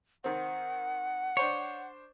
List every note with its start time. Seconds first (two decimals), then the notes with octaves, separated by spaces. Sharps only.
0.24 D#3 C4 F#5
1.37 D4 C5 C#5 C#6